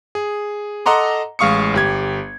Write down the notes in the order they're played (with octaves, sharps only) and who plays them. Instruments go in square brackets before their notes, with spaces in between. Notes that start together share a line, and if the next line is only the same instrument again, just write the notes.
[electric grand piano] G#4
A4 D#5 F#5 A#5 C6 D6
A1 G#3 F5 C#6 D#6 C#7
G1 G4 G#6